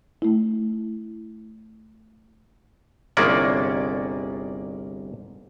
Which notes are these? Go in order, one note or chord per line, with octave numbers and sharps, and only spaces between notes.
A3 E4
G1 C2 G#3 A#3 C#4 D5